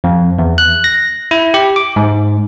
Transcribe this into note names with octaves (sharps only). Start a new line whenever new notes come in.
F2
E2
F#6
A#6
E4
G4
D6
G#2